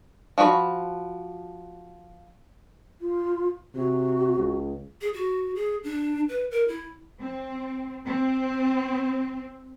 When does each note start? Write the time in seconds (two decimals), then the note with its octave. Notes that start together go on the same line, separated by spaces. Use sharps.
0.38 F3 F#4 G#4 B5
3.01 F4
3.75 C3 F#4
4.38 C#2
5.01 G#4
5.14 F#4
5.55 G#4
5.84 D4
6.29 B4
6.51 A#4
6.68 E4
7.20 C4
8.06 C4